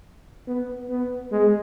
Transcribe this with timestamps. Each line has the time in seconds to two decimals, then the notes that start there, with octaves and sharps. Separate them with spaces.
0.48 B3
0.90 B3
1.32 G#3